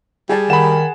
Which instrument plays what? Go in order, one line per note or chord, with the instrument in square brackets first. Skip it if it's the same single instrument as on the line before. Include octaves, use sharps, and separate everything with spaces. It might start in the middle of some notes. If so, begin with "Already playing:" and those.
[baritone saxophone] G3 [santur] G#4 A5
[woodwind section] D#3 [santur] F#5 [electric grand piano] B5 E7